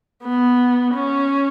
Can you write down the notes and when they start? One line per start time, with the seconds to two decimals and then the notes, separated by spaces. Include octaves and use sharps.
0.24 B3
0.94 C#4